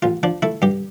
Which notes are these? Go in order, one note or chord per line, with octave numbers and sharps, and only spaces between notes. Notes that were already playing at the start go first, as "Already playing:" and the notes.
A1 F4
F3 D4
A3 E4
G2 G4